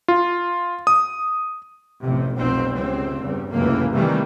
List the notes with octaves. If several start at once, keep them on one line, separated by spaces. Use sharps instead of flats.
F4
D#6
A1 F2 C3
F1 B1 F2 B2 C4
C#2 G2 C4
E2 G2 C#3
F1 C#2 F#2 A2 E3 A#3
C3 D#3 E3 G3 A3 A#3